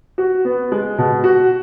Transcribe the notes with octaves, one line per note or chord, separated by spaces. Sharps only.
F#4
B3
G#3
B2
F#4